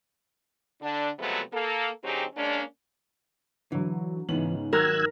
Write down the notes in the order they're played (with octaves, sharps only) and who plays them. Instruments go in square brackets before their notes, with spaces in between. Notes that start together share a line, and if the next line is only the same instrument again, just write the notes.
[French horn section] D3 D4
C3 F3 F#3 G#3 A3 B3
A#3 A4
D3 F#3 C4 D#4 G4 G#4
G#3 A#3 C#4 D4
[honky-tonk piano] D3 F#3 [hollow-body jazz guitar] E3
[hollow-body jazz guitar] C#2 B3 C#4 [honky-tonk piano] G#2 F#7 [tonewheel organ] E3
[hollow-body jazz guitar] D#3 F#3 G4 [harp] A#4 [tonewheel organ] E6 F#6 G#6